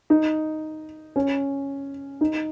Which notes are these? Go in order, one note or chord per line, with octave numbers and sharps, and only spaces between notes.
D#4
C#4
D#4